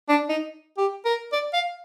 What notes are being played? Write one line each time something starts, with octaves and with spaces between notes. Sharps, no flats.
D4
D#4
G4
A#4
D5
F5